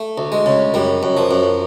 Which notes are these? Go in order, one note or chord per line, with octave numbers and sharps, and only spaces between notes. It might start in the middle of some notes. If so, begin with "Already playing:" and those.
Already playing: A3
D2
G#3
C#3
F#2 G3
F#2
F3
F#2